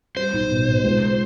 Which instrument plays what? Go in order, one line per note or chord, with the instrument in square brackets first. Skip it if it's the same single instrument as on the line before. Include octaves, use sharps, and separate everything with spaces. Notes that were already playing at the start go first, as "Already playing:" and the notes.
[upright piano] G3 [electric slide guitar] C5
[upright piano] B1
B2
B2
C#2